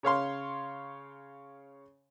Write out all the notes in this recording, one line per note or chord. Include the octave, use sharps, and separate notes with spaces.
C#3 C#5 F5 C6